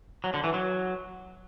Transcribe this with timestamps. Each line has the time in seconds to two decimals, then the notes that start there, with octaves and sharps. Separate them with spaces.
0.24 F#3
0.34 D3
0.44 E3
0.54 F#3